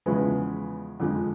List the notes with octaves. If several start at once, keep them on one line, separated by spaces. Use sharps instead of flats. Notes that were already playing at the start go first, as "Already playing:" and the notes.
E2 C#3 F3 G#3 B3
F2 D3 F3 G#3